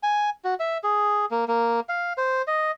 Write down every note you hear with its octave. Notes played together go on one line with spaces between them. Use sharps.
G#5
F#4
E5
G#4
A#3
A#3
F5
C5
D#5